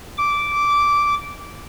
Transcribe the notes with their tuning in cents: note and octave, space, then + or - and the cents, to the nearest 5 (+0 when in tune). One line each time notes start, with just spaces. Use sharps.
D6 -10